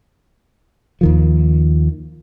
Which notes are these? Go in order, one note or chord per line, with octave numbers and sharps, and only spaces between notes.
D#2 D#3 F3